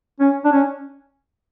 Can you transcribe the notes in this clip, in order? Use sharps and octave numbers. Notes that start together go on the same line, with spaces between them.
C#4
D4
C#4